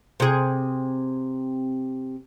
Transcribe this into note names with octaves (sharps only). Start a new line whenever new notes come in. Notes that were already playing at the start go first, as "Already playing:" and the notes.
C3 G#4